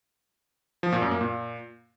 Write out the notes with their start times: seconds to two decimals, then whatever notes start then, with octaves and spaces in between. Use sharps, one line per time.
0.83 F3
0.92 A#2
1.02 F#2
1.11 A#3
1.21 A#2